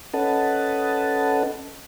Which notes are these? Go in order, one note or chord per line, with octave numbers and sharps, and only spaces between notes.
C#4 A4 B4 D#5 F#5 A5